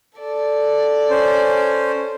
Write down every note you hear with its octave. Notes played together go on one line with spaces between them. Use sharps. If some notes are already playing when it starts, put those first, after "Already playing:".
A4 D5
C#4 C5